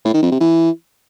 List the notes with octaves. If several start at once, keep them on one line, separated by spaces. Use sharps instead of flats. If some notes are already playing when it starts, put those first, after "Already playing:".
A2
D#3
F2
C3
E3